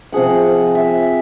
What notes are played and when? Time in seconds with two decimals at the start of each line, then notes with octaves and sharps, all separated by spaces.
0.12 C3 F3 G#4 F#5
0.75 E5